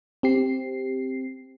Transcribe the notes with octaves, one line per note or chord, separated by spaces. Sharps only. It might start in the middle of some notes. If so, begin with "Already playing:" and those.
C4 G4 C7